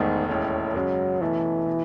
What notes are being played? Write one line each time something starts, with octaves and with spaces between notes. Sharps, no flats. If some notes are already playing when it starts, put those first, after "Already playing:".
Already playing: E1 E2 G#2 D#3 A3
E1 D#2 A2 D#3 G#3 C#4
F#2 C#3 F#3 G#3 C#4
B1 B2 E3 A3 C#4
B2